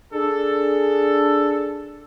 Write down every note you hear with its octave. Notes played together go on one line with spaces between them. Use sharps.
D4 G#4 A4